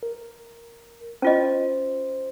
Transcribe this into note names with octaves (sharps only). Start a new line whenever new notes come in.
A#4
C#4 F4 C5 D#5